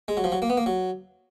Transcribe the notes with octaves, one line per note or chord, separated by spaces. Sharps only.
G#3
F#3
F3
F#3
A#3
B3
A#3
F#3